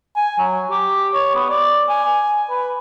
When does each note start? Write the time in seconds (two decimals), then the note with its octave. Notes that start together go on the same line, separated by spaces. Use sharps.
0.16 G#5
0.38 F#3
0.70 G4
1.14 C#5
1.35 B3
1.49 D5
1.89 G#5
2.50 B4